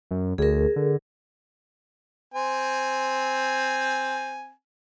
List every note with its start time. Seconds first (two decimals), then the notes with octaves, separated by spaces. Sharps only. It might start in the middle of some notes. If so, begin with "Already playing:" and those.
0.11 F#2
0.38 D2 G#4 A#4
0.76 D3
2.34 C4 G#5